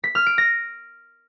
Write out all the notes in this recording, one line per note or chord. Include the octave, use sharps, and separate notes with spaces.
B6
F6
D7
A#6